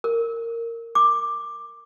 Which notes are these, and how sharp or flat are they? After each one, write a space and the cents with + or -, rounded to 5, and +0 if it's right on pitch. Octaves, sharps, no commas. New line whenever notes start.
A#4 -15
D6 +10